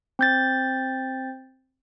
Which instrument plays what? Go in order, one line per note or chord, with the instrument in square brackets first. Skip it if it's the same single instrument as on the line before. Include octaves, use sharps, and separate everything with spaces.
[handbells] C4 G6 A6